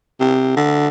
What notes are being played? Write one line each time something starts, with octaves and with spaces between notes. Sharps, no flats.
C3
D3